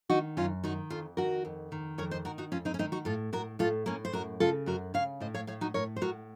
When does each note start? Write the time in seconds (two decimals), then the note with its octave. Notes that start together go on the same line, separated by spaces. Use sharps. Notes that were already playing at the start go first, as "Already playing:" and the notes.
0.10 D#3 D#4 F#4
0.37 F#2 C#4 F4
0.64 D#3 D#4 F#4
0.90 F2 F4 A4
1.17 D#3 F#4 A#4
1.45 F2
1.72 D#3
1.98 F2 A#4 C#5
2.11 C5 D#5
2.25 D#3 F#4 A#4
2.38 D#4 F#4
2.52 F2 C#4 F4
2.65 C4 D#4
2.74 C#4
2.79 D#3 C4 D#4
2.92 D#4 F#4
3.05 A2 F4 A4
3.33 A2 F#4 A#4
3.59 A2 F4 A4
3.86 A2 A#3 C#4
4.05 C5
4.13 F#2 F#4 A#4
4.40 C#3 F4 A4
4.66 F#2 F#4 A#4
4.94 C#3 C#5 F5
5.20 A2 C5 D#5
5.34 C#5 F5
5.47 A2 C#5 F5
5.61 D#4 F#4
5.74 A2 A#4 C#5
5.96 C5
6.01 A2 F#4 A#4